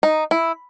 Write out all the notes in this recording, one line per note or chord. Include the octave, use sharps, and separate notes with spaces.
D#4
E4